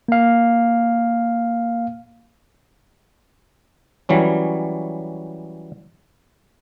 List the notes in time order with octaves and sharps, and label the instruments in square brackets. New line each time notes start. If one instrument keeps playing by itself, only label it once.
[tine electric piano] A#3 F5
[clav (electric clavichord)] E3 F#3 G3 C#4